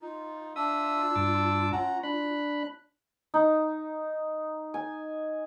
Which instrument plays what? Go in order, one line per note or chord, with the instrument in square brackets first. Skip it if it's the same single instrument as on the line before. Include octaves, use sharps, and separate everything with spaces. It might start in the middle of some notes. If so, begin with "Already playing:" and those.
[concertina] D#4 [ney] F4
[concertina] D4 E6 [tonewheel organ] E5 D#6
[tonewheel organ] G2 A5 D6
[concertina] C#4 F#5 A#5
[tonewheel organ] D4 B5 [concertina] F#6
[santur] D#4
G#5